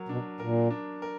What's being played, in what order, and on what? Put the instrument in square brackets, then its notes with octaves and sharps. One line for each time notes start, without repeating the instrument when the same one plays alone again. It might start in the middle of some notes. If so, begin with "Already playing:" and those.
Already playing: [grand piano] F#3 A#4
[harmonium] B2 [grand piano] D4
[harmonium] A#2 [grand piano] A#4
[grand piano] D4
A#4